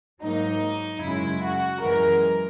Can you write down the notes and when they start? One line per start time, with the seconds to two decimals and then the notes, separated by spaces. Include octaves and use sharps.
0.22 G#2 F#3 A#3 D#4
1.02 F#2 C#3 G#3 E4
1.42 F#4
1.82 F#2 E3 G#3 A#4